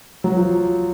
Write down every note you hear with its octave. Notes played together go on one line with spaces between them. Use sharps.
F#3
F3